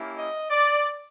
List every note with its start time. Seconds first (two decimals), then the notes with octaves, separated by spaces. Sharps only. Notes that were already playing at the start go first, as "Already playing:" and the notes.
Already playing: A#3 C#4 E4 G4
0.14 D#5
0.50 D5